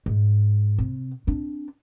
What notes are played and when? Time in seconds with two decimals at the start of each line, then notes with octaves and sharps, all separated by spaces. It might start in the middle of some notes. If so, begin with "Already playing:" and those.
0.06 G#2
0.78 C3
1.27 C4 D4